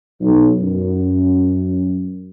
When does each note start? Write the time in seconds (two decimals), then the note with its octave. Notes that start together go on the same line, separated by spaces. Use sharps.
0.21 B1
0.61 F#2